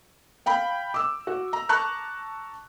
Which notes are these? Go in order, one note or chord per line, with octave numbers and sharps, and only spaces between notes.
F5 G5 B5
D6 E6
F#4
A#5
A5 A#5 C#6 F#6